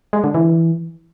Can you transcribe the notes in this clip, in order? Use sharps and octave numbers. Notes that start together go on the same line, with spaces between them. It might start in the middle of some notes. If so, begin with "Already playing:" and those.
G#3
D3
E3